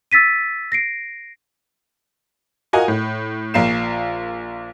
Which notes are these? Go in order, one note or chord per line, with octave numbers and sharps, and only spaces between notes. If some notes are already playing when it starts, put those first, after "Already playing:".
E6 A6 B6 D#7
A#6 C7 D7
F4 F#4 A#4 D#5 G#5
A2
A#1 A#3 C7 E7